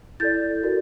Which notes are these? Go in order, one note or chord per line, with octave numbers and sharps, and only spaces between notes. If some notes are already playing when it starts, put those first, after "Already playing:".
E4 A4 D5 G6 A6
F#4 A#4 D5